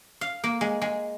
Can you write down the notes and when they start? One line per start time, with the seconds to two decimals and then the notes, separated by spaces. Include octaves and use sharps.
0.21 F5
0.44 A#3
0.61 G#3
0.81 G#3